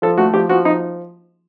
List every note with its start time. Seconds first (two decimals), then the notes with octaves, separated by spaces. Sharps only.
0.02 F3 A4
0.18 A3 F#4
0.34 F3 G4
0.49 F3 F#4
0.64 F3 D#4